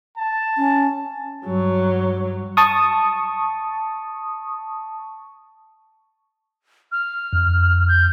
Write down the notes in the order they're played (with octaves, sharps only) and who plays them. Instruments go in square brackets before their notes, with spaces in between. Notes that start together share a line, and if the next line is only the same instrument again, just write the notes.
[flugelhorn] A5
[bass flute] C#4
[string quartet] G2 F#3
[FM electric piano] A5 C#6 D#6
[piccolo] F6
[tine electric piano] F2
[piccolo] G6